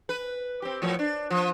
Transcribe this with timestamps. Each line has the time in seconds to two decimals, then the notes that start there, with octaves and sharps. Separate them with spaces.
0.09 B4
0.62 C4 G4
0.82 A2 F3 C#5
0.99 D4
1.30 F3